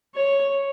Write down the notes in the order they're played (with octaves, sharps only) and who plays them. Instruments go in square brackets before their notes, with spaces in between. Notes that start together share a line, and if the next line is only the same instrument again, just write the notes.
[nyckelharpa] C#5